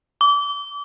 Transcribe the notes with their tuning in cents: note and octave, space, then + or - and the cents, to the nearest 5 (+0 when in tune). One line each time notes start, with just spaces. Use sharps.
D6 -30